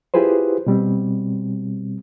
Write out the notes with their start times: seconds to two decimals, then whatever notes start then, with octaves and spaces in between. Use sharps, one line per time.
0.14 E4 F4 G4 G#4 B4 C5
0.67 B2 G3 C4